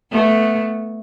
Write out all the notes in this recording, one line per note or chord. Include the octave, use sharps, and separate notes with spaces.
A3 B3